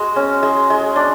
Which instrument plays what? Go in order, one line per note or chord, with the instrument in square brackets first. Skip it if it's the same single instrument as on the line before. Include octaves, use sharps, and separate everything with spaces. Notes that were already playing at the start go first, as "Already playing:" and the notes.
Already playing: [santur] G#3 F#4
C#4
G#3
G#3
D4